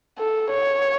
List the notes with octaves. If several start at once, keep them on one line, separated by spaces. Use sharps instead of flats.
A4
C#5